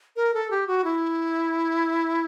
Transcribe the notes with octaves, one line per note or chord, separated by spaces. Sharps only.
A#4
A4
G4
F#4
E4